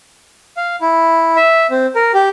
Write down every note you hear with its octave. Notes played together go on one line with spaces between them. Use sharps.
F5
E4
E5
C4
A#4
G4